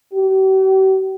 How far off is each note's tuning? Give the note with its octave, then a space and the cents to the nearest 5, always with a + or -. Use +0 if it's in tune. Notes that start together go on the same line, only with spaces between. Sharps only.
G4 -45